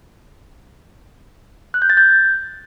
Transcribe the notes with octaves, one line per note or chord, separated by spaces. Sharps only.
F#6
G6
A6
G6